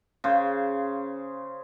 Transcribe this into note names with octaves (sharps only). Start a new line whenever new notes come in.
C#3 C5